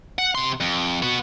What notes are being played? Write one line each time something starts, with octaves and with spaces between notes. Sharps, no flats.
F#5
C3 C6
F2
B3 F#4